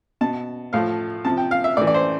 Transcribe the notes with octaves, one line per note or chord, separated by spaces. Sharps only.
B2 A5
A2 F3 F5
C3 F3 A5
G5
F5
E5
A2 E3 D5
D5
C5